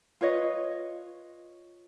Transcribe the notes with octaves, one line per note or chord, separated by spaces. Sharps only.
F4 B4 C#5 D#5